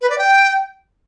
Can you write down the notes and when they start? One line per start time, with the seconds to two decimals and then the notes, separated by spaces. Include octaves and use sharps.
0.01 B4
0.10 D5
0.18 G5